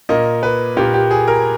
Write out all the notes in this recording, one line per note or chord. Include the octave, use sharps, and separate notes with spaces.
A#2 A#3 D#5
B4
A#2 A#3 G4
G4
G#4
A#4